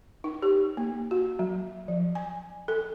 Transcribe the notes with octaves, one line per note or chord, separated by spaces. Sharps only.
D#4
G4
A#3
F#4
F#3
F3
G#5
A4